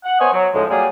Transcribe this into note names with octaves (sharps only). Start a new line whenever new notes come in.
F#5
B3 C5 C#5 D#5 G#5
F#3
D2 A2 F3 G#3
F#3 G3 A#3 G#4